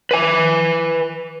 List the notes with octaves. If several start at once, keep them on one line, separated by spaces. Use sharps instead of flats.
B4 G#5